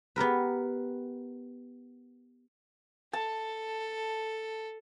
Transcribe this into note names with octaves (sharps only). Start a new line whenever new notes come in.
B3 G4 A#4 B4
A4 A5